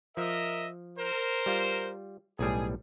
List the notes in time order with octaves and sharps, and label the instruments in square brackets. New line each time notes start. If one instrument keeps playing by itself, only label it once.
[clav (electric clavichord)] F3 [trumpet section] A#4 D#5 E5
[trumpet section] A#4 C5
[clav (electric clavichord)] G3 F4
[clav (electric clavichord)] B1 A2 G3 [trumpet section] G#4